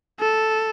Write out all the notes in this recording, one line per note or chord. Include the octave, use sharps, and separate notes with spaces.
A4